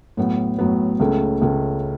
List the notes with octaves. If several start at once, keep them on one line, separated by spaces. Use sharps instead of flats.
A2 F#3 B3
A2 F#3 B3
C#2 C#3 A3
C#2 C#3 A3